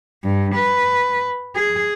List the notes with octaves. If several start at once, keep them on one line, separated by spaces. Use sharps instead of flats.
G2
B4
G#4